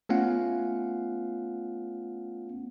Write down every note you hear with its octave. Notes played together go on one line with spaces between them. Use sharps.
A3 B3 C#4 F4 F5 F#5